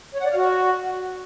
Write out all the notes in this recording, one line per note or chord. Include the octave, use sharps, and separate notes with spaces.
C#5
F#5
D5
F5
F#4